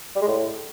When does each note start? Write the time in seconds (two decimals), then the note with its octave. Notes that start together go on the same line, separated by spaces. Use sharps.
0.16 G3
0.22 G#3
0.28 A2